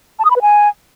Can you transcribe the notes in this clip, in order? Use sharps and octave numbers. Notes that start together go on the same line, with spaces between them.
A5
D#6
B5
B4
G#5